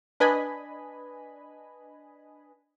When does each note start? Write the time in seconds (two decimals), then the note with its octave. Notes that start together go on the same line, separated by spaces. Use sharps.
0.20 D4 B4 D#5 G#5 B5